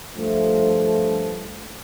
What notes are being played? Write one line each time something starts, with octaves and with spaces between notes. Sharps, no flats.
G2 F3 A3